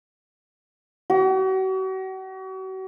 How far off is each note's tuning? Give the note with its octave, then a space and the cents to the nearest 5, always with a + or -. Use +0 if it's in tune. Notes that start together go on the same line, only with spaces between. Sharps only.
F#4 +40